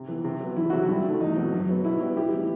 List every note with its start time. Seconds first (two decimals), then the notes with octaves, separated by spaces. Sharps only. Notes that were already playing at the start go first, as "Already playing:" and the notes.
Already playing: C3
0.08 E3 B3
0.24 C3
0.40 F#3 B3
0.56 E2 E4
0.70 C3 F#3 C4 F#4
0.83 E4
0.88 G2
1.04 D#3 A3
1.21 E2 D#4
1.36 B2 F#3 C4
1.52 F#2
1.69 F#3 B3
1.84 B2 E4
2.01 G3 B3
2.16 A2 E4 G4
2.32 E3 G3 C4